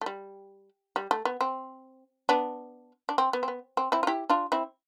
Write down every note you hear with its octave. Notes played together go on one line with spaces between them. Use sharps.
A3
G3
G3
A3
B3
C4
B3 D4
D4
C4
B3
C4
B3
C4
C4 E4
F4
E4 G4
D4 F4
C4 E4